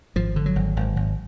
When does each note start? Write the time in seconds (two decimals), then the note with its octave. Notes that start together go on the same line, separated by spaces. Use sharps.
0.16 G#1 F3
0.36 D3
0.46 F#3
0.56 G#1
0.77 G#1
0.96 G#1